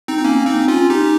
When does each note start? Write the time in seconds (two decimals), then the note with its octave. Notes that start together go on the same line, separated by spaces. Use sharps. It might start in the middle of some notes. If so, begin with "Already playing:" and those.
0.08 C4 D#4
0.18 D#4
0.24 A#3 C#4
0.46 C4 D#4
0.68 C#4 F4
0.90 D#4 G4